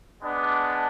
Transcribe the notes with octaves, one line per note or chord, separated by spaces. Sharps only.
G#3 B3 D4